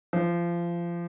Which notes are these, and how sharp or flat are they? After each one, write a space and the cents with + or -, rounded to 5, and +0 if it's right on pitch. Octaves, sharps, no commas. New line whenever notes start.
F3 -25